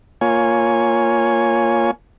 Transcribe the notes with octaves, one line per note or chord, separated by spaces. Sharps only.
A#3 F4 C#5 G#5